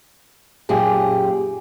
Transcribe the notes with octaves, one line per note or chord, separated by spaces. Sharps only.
F#2 A#2 G4 G#4